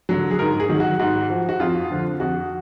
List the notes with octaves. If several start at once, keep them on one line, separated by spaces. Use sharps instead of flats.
D3 F#3
G#4
G#2 A#4
G#4
D#3 F#3
F#4
G#2 F#4
F3
F#4
F2 F4
D3 F3
F2 F#4